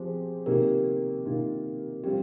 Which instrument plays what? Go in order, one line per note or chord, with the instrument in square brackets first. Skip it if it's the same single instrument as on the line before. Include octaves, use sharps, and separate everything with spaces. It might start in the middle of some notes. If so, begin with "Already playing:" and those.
Already playing: [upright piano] F3 C4 G4 [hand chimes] G#4 C5
[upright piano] C3 D#3 A#3 F4 [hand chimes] G4 A#4
[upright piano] C3 D#3 A#3 F4
[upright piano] G3 C4 F4 [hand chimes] G4